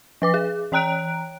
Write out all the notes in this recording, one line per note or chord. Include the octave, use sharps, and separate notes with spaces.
F3 B4 D6
G#4
E3 C#5 G5 A#5 F#6 D7